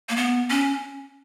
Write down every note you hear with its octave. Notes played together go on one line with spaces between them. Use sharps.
A#3
B3
C#4